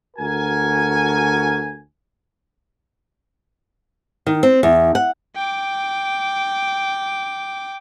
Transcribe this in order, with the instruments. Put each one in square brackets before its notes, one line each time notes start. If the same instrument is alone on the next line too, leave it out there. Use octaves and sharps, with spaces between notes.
[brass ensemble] D2 F#4 A#4 G#5
[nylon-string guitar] D#3
C4
E2
F#5
[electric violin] G5 D6